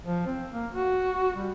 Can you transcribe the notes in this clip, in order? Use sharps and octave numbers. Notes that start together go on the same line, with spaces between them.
F3
C4
A#3
F#4
G3